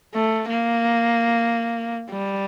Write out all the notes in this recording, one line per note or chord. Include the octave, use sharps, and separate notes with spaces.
A3
A#3
G3